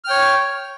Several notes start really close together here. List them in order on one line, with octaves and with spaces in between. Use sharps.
F6 G5 C#5